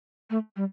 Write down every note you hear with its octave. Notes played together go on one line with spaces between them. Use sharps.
A3
G3